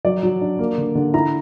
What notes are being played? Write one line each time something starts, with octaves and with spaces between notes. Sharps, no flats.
F#3 D5
F#3
D4
A#3
D3
D3
E4 A#5